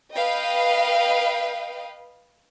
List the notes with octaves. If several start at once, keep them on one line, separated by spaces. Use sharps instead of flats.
B4 D#5 F5 G5